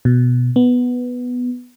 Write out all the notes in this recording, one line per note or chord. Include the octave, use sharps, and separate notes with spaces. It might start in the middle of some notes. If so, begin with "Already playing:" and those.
B2
B3